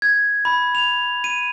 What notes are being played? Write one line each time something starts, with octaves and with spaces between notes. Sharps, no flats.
G#6
B5
F7
D#7